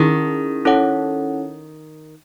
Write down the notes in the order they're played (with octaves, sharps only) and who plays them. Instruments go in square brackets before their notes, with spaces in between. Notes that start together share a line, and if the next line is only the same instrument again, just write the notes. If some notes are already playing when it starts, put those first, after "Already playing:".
Already playing: [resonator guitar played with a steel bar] D#3 [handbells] C#4 E4 G#4
[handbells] C#4 E4 A4 C#5 F#5